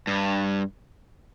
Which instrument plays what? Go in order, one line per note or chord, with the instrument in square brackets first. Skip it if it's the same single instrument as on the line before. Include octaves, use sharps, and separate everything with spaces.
[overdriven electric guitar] G2